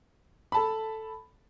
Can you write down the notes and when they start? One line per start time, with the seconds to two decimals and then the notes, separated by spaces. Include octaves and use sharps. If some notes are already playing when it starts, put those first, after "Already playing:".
0.52 A4 A5 B5